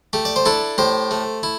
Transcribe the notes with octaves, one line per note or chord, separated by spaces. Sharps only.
A3 G4
D5
C5
D4 E4 A4
A2 G4 C5
A3
E4